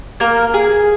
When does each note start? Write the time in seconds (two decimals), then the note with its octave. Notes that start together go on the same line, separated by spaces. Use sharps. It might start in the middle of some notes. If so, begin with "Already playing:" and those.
0.20 A#3 A#4
0.54 G#4